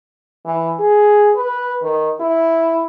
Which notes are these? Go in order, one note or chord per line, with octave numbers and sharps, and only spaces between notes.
E3
G#4
B4
D#3
E4